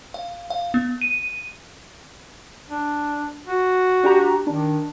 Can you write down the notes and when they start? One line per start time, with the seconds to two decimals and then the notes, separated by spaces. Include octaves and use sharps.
0.14 F5
0.50 F5
0.74 B3
1.01 D#7
2.69 D4
3.47 F#4
4.03 D4 G4 A#5
4.47 D#3 D4